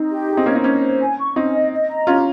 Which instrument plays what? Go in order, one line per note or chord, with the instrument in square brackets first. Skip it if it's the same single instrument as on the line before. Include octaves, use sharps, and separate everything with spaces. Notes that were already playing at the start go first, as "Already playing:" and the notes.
Already playing: [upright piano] C4 [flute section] D#4
[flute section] G4
G#4
[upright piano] C4 D#4
[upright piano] A#3 C#4 [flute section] D#5
[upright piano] C4 D#4
[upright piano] A#3 C#4 [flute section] C5
[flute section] C5
G#5
C#6
[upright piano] C4 D#4 [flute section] C#4
[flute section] D#5
D#5
A#5
[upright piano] C#4 F4 [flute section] G4